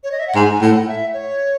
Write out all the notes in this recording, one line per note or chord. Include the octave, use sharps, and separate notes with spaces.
C#5
D#5
E5
F#5
G#2 G#5
G#5
A2 F#5
E5
C#5